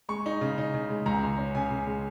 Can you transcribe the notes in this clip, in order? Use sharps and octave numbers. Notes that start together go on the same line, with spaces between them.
G#3 C#6
D#4
C#3
D#4
C#3
G#3
C#2 A#5
C#2
C#4
C#3 G#5
C#3
G#3